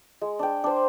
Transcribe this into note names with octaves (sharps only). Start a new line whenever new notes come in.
G#3
D4 G5
D4 C5